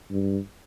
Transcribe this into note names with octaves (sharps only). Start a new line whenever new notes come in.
G2